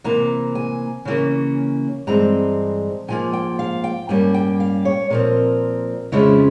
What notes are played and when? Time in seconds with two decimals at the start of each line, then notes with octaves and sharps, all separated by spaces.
0.04 C3 E3 A#3 A#5
0.55 G#5
1.05 C#3 E3 A#3 C#4
2.07 G2 E3 G#3 C4 A#5
3.08 G#2 F3 A#3 G#5
3.33 G5
3.59 F5
3.84 G5
4.09 G2 G3 A#3 C#4 G#5
4.34 G5
4.60 F5
4.85 C#5
5.10 A#2 F3 C4 A#4
6.12 F2 C#3 F3 G#3 C#4 E4